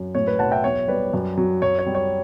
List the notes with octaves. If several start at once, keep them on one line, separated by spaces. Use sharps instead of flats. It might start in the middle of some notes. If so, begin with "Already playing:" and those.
Already playing: F#2
A2 C#5
B4
B1 F#5 A5
E5 G5
E2 C#5
G3 B4 D5
F#2
F#3
F#2 C#5
C#5
G3
C#5